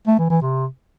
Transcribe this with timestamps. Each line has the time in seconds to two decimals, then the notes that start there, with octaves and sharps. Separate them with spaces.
0.07 A3
0.18 E3
0.30 E3
0.41 C3